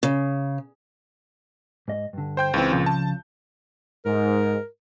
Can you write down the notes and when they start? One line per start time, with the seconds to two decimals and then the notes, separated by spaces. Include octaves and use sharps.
0.03 C#3
1.88 G#2 D#5
2.13 G2 D3
2.37 C5 G5 G6
2.54 C#2 E3 C4
2.72 C#2 A#2 C#3 F3
2.86 A5
4.06 G#2 A#4